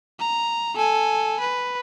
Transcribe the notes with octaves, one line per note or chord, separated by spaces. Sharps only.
A#5
A4 G#5
B4